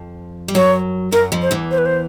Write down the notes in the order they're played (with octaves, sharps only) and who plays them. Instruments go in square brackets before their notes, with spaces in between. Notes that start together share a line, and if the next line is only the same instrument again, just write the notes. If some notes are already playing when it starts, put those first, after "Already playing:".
Already playing: [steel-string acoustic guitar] F2 F3
G3
[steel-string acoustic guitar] F#2 F#3 [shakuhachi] C#5
[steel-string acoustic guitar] F#2 F#3 [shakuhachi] A#4
[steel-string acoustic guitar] F2 F3
[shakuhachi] C5
[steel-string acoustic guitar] E2 E3
[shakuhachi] C5
B4
C5